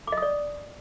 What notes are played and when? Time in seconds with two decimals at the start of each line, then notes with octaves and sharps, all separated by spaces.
0.07 D6
0.12 D#5
0.17 D#6
0.22 D5